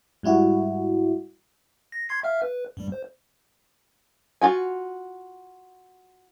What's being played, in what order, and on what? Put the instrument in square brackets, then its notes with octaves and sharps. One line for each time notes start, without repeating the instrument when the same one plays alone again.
[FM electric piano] G#2 G3 E4 F#4
[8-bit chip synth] A#6
C6 G#6 C7
E5 F5 F6
B4
G2 G3
C5
[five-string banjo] F4 F#4 G#5